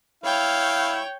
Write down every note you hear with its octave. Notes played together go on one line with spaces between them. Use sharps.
E4 C#5 F5 G5